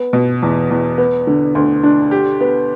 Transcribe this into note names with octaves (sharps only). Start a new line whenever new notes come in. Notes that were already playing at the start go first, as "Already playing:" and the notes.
Already playing: B3
B2
E2
E2
B3
D3
D2
D4
G4
B3